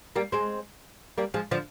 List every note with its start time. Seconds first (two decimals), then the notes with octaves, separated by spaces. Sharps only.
0.16 G3 A#3
0.32 G#3 C4
1.18 G3 A#3
1.34 F3 G#3
1.51 D3 F3